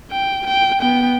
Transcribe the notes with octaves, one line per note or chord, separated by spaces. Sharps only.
G5
G5
B3 G5